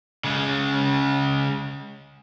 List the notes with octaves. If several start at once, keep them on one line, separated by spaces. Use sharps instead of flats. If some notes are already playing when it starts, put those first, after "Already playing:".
C#3 G#3